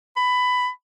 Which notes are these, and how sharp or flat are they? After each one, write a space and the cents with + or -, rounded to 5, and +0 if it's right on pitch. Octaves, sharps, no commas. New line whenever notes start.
B5 +15